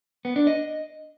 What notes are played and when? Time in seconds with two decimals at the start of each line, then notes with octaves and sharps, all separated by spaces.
0.25 B3
0.36 D4
0.47 D#5